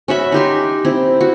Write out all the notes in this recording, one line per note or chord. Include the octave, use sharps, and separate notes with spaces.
C#4 F#4 E5 B5
D#4 G4 C6
C4 E4
F#4